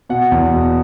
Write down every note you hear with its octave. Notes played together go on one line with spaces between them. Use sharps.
B2 F#5
E2
B2